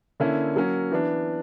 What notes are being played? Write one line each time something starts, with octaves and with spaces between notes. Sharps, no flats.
D3 A#3 C#4 E4
F#3 A#3 C#4
E3 B3 D4